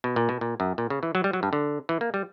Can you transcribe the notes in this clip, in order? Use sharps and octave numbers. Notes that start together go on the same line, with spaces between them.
B2
A#2
B2
A#2
F#2
A#2
C#3
E3
F#3
G3
F#3
G2
D3
E3
A#3
G3